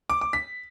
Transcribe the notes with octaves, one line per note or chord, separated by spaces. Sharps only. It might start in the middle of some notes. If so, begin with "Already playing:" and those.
D6
D6
B6